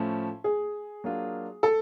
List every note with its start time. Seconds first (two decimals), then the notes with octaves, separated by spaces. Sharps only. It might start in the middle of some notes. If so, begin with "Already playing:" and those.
Already playing: A2 F3 A3 C#4
0.44 G#4
1.04 F#3 A#3 D4 F4
1.63 A4